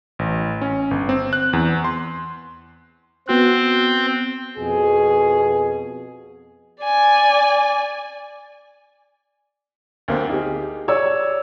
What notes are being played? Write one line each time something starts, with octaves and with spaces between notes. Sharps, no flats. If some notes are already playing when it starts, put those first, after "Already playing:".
A1
C#4
G1
C4
F#6
E2
C6
B3 C4 F#4 F#6
F2 B2 G#4
D5 G#5
D2 A#3 C4
D#4 G4 G#4
C#5 D5 E6